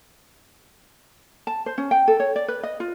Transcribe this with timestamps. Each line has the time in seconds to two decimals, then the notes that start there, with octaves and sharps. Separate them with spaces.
1.47 A5
1.66 C5
1.78 C#4
1.91 G5
2.08 A4
2.20 C#5
2.36 D5
2.48 B4
2.63 D#5
2.80 F4